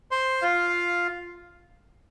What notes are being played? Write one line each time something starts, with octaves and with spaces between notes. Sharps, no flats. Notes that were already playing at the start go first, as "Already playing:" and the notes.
C5 C6
F4 F5